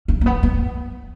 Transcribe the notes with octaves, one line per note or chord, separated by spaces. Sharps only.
C#4
A#3
B3
B3